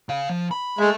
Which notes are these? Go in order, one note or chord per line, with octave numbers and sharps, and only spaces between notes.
C#3 F5
F3
B5
G#3 A4 E5